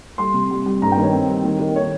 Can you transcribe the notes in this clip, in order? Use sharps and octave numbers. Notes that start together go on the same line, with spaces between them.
G3 C6
C3
G3
G3
G2 A#5
G5
D#3
C#5
C4
G3
D#3
D#3
C#5